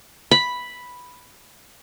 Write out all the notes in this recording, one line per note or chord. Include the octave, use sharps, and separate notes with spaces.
B5